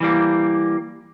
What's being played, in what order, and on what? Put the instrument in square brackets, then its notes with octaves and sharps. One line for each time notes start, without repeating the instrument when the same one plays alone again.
[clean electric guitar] E3 G3 A#3